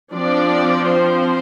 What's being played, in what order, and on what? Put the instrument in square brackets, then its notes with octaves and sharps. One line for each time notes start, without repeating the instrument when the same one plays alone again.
[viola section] F3 C4 D4 D5
C4 C5